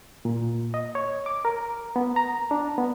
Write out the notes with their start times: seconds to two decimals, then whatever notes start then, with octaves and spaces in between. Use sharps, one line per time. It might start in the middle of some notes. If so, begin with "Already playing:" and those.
0.25 A#2
0.74 D#5
0.95 C#5
1.26 D6
1.45 A#4
1.96 B3
2.16 A#5
2.51 D4
2.78 B3